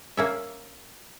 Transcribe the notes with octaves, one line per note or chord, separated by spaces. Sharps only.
A#3 C#4 E5